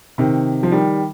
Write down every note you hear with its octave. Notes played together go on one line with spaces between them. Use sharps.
C3 D#3
F3
D#3 G3